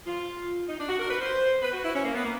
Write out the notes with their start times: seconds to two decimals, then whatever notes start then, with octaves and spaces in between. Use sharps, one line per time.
0.06 F4
0.68 D#4
0.79 D4
0.89 F#4
0.99 A#4
1.09 B4
1.20 C5
1.62 B4
1.72 F#4
1.83 E4
1.94 C#4
2.04 A#3
2.14 B3
2.23 A#3